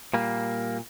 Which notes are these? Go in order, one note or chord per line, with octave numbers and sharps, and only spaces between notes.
A#2 G3 A#3